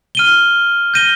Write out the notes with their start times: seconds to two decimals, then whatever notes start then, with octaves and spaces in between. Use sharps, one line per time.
0.15 F6 D#7 G7
0.94 G6 A#6 D#7 G7